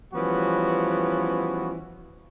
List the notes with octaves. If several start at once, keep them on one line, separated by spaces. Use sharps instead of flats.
E3 F3 G3 B3 C#4 F#4